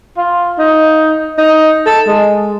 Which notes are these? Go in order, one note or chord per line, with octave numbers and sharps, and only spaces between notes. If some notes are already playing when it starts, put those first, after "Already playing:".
F4
D#4
D#4
A4
G#3